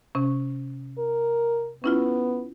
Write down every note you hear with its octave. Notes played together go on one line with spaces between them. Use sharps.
C3 C#4
A#4
B3 C#4 E4 F4